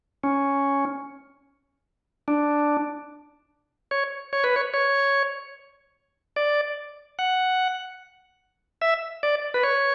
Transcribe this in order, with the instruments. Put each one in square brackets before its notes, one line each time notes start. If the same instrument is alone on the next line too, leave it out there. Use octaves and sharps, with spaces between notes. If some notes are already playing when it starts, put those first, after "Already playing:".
[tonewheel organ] C#4
D4
C#5
C#5
B4
C#5
C#5
D5
F#5
E5
D5
B4
C#5